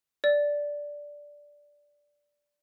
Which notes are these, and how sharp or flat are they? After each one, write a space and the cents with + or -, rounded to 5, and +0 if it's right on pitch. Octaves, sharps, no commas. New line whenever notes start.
D5 -5